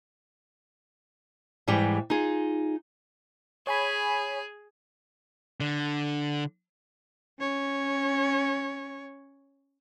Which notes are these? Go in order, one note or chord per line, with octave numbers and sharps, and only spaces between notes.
G#2 E3 G3 G4 G5
D#4 F4 G#4
G#4 C#5 G#5 B5
D3
C#4 C#5